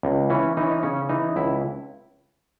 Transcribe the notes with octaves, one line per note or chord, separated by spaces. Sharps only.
C#2
E3 C#4
E3 D#4
C#4
D#4
C#3 C#4
E3 D#4
C#2 E4